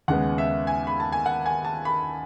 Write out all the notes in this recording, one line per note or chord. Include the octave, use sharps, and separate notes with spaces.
D#2 C#3 G#3 B3 F#5
E5
G#5
B5
A5
G#5
F#5
G#5
A5
B5